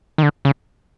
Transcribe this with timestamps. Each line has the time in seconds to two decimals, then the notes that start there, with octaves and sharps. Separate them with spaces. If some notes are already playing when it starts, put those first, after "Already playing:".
0.18 D#3
0.23 D3
0.45 C#3